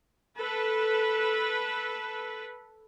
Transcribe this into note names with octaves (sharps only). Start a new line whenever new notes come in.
A4 B4